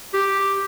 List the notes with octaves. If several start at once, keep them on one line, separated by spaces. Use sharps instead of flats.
G4